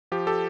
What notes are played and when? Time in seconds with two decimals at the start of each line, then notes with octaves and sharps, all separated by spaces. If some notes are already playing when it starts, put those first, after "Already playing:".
0.12 F3 G4
0.27 G4 A4